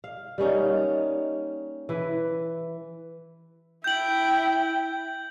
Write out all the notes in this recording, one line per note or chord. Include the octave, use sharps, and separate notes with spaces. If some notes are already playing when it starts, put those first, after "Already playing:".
F5
G3 A#3 C#4 D#4
E3 B4
E4 G5 G6 F#7